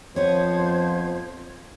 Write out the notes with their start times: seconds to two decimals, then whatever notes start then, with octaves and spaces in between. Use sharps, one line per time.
0.16 F2 F3 B3 C5 C#5 G#6